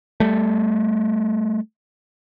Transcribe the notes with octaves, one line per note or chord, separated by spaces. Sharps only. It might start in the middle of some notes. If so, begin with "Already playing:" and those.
G3 A3